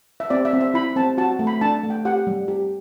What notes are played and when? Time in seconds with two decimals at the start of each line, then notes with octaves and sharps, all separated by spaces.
0.20 E5
0.30 C4 D5
0.45 E5
0.53 C4
0.61 E5
0.74 E4 B5
0.96 C4 A5
1.18 F#4 A5
1.39 A3
1.47 B5
1.61 D4 A5
1.83 A3
1.90 G5
2.05 G4 F#5
2.27 G3
2.48 G4